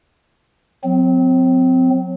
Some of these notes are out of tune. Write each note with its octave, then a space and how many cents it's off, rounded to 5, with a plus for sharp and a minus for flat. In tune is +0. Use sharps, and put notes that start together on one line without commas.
F#3 -40 C4 -25